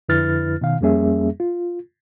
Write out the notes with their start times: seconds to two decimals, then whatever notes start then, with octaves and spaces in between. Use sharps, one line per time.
0.09 F2 D3 E4 B4 F6 A6
0.61 B2 D#3 F5
0.81 F2 G3 A#3 C#4 G#4 E5
1.40 F4